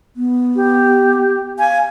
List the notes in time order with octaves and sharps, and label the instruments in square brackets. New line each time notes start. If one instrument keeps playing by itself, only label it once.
[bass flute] B3
[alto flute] G4
[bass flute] F5 [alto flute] G#5